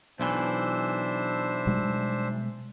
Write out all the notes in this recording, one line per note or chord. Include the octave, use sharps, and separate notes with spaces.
B1 E3 D4 C5 E5
B2 G3 G#3